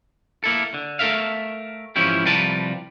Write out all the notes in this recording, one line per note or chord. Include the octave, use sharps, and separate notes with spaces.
A#3 E4 A4
D3
A3 A4 A#4 E5 F5
G#2 E3 F3 C#4 E4 G4
C2 F3 G3 A#4 B4 A5